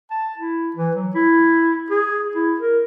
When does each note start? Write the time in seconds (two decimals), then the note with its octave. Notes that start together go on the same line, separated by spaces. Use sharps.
0.10 A5
0.38 E4
0.76 E3
0.96 F#3
1.15 E4
1.90 G#4
2.35 E4
2.60 A#4